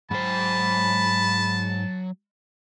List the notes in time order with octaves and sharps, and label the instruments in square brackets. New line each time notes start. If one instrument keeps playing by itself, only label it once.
[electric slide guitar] G#2 C5 [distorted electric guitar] F#3 G5 [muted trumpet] A5 [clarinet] B5